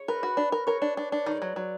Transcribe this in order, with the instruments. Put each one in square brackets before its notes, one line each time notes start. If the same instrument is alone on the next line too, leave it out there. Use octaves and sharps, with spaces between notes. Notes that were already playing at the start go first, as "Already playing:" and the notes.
Already playing: [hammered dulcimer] C#5
[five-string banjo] A#4 [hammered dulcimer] B4
[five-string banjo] F#4
D4
A#4
[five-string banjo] A#4 [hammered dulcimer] C#5
[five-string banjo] D4
D4
D4
[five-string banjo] D#3 [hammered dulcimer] D5
[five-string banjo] F#3
F#3